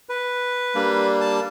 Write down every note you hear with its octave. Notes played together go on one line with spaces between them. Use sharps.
B4
G3 A#3 D4
A5